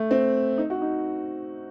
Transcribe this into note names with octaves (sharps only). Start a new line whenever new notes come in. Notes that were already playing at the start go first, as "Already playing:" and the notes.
Already playing: A3
C4
D#4
F#4
D#4